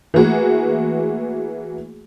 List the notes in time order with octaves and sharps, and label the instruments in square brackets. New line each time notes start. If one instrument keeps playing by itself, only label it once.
[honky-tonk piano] E3 A3 A#3 F#4 G#4